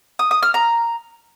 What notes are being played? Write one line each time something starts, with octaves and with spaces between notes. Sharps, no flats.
D#6
D#6
F6
A#5